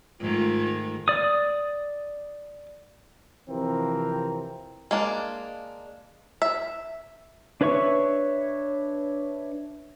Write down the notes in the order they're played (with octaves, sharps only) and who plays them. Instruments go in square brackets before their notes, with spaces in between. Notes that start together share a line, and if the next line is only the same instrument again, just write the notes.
[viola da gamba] G#2 D#3 A3 [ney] F4
[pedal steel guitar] D5 D#6
[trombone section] C3 E3 F3 C4 A#4
[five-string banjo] G#3 A#3 D4
E5
[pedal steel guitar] D4 B4 C#5 E5 C#6